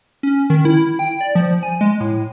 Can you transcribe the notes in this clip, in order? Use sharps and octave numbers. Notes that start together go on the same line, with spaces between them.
C#4
D#3
E4
G5
D5
F3
G#5
G#3
A2